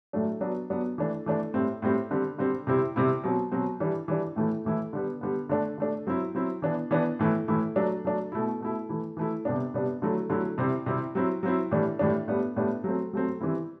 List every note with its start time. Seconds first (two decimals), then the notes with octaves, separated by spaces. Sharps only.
0.13 A2 F#3 A3 D4
0.41 F#3 B3 D4
0.70 F#3 B3 D4
0.98 E3 A3 D4
1.26 E3 A3 D4
1.54 A2 G3 C4
1.82 A2 G3 C4
2.11 D3 G3 C4
2.38 D3 G3 C4
2.67 C3 G3 C4 E4
2.96 C3 G3 C4 E4
3.24 B2 F#3 C4
3.52 B2 F#3 C4
3.80 E3 G3 D4
4.08 E3 G3 D4
4.36 A2 E3 A3 E4
4.65 A2 E3 A3 E4
4.93 D3 G3 B3
5.21 D3 G3 B3
5.49 D3 A3 D4
5.78 D3 A3 D4
6.07 F#3 C4 E4
6.35 F#3 C4 E4
6.62 E3 B3 D4
6.91 E3 B3 D4
7.19 A2 E3 A3 E4
7.48 A2 E3 A3 E4
7.76 F#3 A3 D4
8.05 F#3 A3 D4
8.32 B2 A3 E4
8.61 B2 A3 E4
8.89 E3 A3 E4
9.17 E3 A3 E4
9.45 C3 G3 B3 D4
9.74 C3 G3 B3 D4
10.02 D3 F#3 A3 E4
10.30 D3 F#3 A3 E4
10.58 C3 G3 C4 E4
10.86 C3 G3 C4 E4
11.15 F#3 C4 E4
11.43 F#3 C4 E4
11.71 A2 E3 G3 D4
11.99 A2 E3 G3 D4
12.28 A2 G3 B3 D4
12.56 A2 G3 B3 D4
12.84 F#3 A3 C4
13.13 F#3 A3 C4
13.41 E3 G3 C4 E4